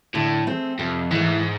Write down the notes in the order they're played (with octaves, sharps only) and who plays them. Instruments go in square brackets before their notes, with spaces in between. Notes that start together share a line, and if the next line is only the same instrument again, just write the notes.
[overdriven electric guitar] A2 [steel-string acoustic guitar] D3
[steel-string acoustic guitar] A3 C4 G#4
[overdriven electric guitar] F2 [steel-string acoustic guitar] C3
[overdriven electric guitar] G#2 [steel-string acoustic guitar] E3 A3